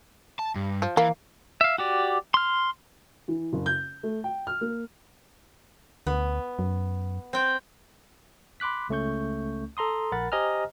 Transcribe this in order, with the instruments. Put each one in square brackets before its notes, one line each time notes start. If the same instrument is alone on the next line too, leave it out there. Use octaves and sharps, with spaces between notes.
[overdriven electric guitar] A5
G2
[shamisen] F3
[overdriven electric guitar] E3 [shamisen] A#3
[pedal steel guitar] E5 F5
F#4 G4 D5
C6 F6
[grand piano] E3
F#1
G6
A3
G5
F6
A#3
[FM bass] D2 [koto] B3
[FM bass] F#2
[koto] C4 G5
[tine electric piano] B5 C6 D6 F#6 B6
C#2 A3 C#4 C#6 G6
A4 A#5 C6 D#6
A#1 A#4 F#5 B5 A6
G4 C5 D#5 G#5 A#5 F6